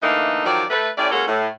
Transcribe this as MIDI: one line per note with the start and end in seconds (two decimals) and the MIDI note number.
0.03 0.44 50
0.03 0.44 52
0.03 0.44 57
0.03 0.44 58
0.03 0.44 63
0.45 0.65 51
0.45 0.65 53
0.45 0.65 54
0.45 0.65 67
0.45 0.65 74
0.70 0.89 57
0.70 0.89 71
0.98 1.10 45
0.98 1.10 57
0.98 1.10 61
0.98 1.10 67
0.98 1.10 74
1.11 1.26 56
1.11 1.26 58
1.11 1.26 61
1.11 1.26 66
1.11 1.26 69
1.11 1.26 70
1.28 1.48 45